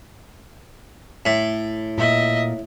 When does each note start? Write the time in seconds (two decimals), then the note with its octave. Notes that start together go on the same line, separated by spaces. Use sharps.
1.26 A2
1.98 A#2 D#5 E5